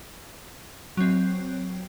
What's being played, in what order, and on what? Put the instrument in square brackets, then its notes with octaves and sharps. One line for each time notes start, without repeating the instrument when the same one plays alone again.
[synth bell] F#3 C4